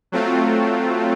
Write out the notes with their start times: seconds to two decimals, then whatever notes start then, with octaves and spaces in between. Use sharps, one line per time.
0.12 F#3 A3 C4 F4